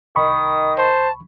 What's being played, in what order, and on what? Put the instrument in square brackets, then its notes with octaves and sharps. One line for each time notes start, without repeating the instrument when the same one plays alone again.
[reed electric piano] C2 B5 C#6 [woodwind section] D#3 [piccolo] D#6
[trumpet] C5 [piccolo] A5